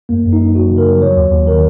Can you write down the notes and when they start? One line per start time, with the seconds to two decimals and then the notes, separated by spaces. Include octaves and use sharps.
0.09 F#2 A#3
0.24 F#2
0.33 D#4
0.39 F#3
0.55 F#3 F#4
0.71 C#3
0.78 A#4
0.86 F#3
1.01 F#3 C#5
1.16 D#2
1.32 D#2
1.47 D#3 A#4